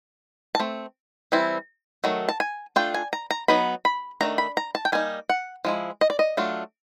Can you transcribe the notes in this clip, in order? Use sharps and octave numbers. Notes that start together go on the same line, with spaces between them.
A5
A3 C4
E3 G3 C4 E4
D#3 F#3 A3
A5
G#5
A3 D4 F4 G5
G#5
A#5
A#5
F#3 B3 D#4 B5
B5
D#3 F#3 A3 D4 A#5
B5
A#5
A5
G5
G3 A#3 D#4 G#5
F#5
F3 G#3 E4
D#5
D5
D#5
F#3 A3 D4 F4